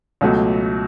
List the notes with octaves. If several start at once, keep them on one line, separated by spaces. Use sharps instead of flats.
C#2 B2 F#3 A3